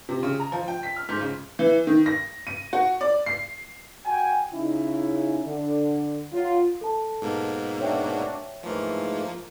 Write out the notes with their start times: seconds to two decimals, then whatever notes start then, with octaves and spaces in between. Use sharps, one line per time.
0.09 C3
0.23 C#3
0.40 A#5
0.52 F3
0.68 G5
0.83 B6
0.96 F6
1.09 G#2
1.21 C#3
1.59 E3
1.87 D#3
2.06 A#6
2.47 D#7
2.73 F#4
3.01 D5
3.26 C7
4.05 F#4 G5 G#5
4.53 C#3 C#4 D#4 E4
5.45 D3
6.32 F#3 F4
6.81 A4 A5
7.22 G#2 B2 A#3
7.80 D4 F#4 C#5 E5 G5
8.63 G#2 E3 F3 A3 A#3